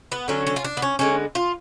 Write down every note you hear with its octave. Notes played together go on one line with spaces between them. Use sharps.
B3
D3 F#3 A3 C#4
C#4
F4
D4
B3
C#4
D3 G#3 B3 C#4
F4